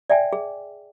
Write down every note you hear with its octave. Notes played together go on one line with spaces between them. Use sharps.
D5 E5 G5 G#5
G#4